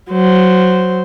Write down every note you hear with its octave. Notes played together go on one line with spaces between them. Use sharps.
F#3 C5